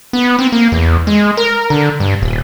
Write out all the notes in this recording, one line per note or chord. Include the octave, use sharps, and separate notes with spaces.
B3
C4
A#3
E2
G#3
A#4
D3
G2
D#1